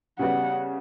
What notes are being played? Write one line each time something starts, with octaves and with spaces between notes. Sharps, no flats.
C#3 G3 B3 F#4 F#5